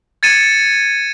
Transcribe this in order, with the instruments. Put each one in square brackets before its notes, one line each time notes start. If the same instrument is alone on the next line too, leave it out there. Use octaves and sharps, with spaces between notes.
[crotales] G#6 A6 C#7 D#7 E7